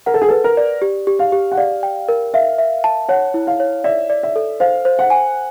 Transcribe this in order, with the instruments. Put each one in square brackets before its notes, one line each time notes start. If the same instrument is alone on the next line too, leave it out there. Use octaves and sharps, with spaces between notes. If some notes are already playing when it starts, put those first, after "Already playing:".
[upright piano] A#4 [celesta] F#5
[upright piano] A4
G#4
[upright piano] A4 [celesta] B4
[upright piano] A#4
[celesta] D5
G4
G4
[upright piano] F5
[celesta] G4
[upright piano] F#5
[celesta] D5 [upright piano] F5
[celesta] G5
A#4
[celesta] E5 [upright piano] F5
[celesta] E5
A5
[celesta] C#5 [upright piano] F#5
[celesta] E4
[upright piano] F5
[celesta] C#5
[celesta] D5 [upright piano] E5
[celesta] D5
[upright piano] E5
[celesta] A4
[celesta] C5 [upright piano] F5
[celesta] C5
[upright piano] F#5
[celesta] G#5